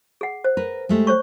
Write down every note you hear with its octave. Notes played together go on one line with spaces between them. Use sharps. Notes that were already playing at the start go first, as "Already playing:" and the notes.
G#4 F#5
C5
A#4 B4
G#3 A3 G4
C5 C#5 C#6